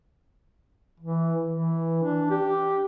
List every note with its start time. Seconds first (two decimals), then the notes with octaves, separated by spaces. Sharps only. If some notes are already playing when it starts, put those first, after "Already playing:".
1.00 E3
1.50 E3
2.03 D4
2.30 G4